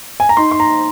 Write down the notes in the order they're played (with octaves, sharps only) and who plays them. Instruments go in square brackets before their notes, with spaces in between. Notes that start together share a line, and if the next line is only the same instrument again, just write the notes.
[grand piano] G#5
A#5
D#4 C6
C6
A#5